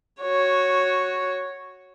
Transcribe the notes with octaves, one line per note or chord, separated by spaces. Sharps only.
F#4 C#5